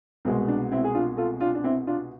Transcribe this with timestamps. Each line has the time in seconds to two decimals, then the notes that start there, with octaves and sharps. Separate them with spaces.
0.25 C2 B2 G#3 C4
0.48 D4
0.72 C4 E4
0.84 G#4
0.94 D4 F4
1.17 F4 A4
1.40 D4 F4
1.55 D4
1.64 C4 E4
1.87 D4 F4